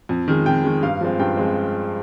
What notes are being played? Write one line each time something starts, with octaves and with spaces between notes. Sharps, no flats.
F2
D#3 G#3
F2 G5
D#3 G#3
G2 F5
F3 G#3 C4
G2 G5
F3 G#3 C4